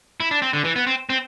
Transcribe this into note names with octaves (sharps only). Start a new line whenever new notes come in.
E4
D4
C4
D3
E3
B3
C4
C4